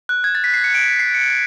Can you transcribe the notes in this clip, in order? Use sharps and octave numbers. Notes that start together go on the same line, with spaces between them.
F#6
G#6
A6
B6
C7
C#7
D7
C7
C#7